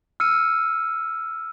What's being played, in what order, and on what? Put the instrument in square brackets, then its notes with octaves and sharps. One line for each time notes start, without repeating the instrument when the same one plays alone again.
[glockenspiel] E6 F6 C#7 D#7